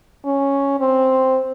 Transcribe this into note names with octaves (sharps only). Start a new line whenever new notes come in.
C#4
C4